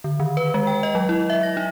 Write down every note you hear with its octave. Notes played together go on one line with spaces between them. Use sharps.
D3
D#3
B4
G#3
G5
D#5
F#3
E4
E5
A#6
D#4